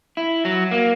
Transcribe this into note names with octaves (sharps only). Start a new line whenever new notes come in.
E4
F#3
A#3